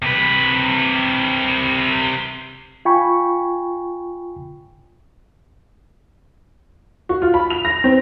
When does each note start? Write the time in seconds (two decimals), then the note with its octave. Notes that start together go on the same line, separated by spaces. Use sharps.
0.02 C3 B4
2.85 F4 G5 G#5 B5 C#6
7.09 F#4
7.22 F4
7.34 B5
7.50 F7
7.65 A#6
7.84 C4